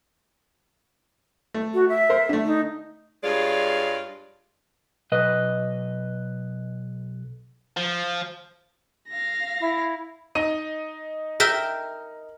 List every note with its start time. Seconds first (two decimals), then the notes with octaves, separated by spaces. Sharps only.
1.54 A3
1.74 F#4
1.89 E5
2.10 A#4 C5
2.29 D3 A3
2.46 D#4
3.24 G2 G#3 F4 C#5 D5
5.12 B1 B4 D#5
7.77 F3
9.08 F5 A#6
9.60 E4
10.35 D#4 D#5 D#7
11.40 A#4 E5 G5